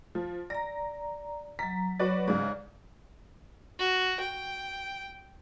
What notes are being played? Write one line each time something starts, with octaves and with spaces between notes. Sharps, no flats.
F3
D5 A#5 A#6
F#3 A#5 B6
F#3 F#4 B4 C#5 D5
G#2 C#3 D5
F#4
G5